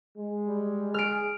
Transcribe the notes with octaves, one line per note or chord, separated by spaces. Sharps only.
G#3
G3
G#4 F6 D7